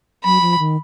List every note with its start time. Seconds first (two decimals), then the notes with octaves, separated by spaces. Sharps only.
0.25 F#3 B5
0.41 F3
0.59 D#3